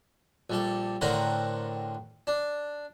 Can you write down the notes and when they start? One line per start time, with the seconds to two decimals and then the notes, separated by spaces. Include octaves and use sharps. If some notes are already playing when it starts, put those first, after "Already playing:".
0.50 A#1 G3 A4
1.01 A2 D3 C4 A#4 F#5 B5
2.27 D4